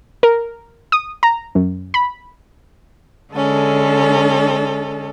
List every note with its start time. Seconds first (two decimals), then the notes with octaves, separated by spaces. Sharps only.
0.23 A#4
0.92 D#6
1.23 A#5
1.55 F#2
1.94 B5
3.33 D3 G#3 C#4 A4